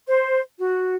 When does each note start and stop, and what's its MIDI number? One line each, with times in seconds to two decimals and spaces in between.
0.06 0.39 72
0.58 0.96 66